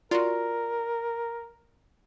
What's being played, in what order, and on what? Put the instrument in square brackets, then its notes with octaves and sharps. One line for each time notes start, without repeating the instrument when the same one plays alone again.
[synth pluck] F4 F#4 [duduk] A#4 [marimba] D5